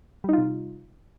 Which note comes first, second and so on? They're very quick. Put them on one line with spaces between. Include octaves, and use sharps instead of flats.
G3 D#4 F4 C3